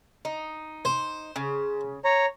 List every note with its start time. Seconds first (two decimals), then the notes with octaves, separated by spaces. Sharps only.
0.25 D#4
0.85 C5
1.36 C#3
2.05 C#5 A#5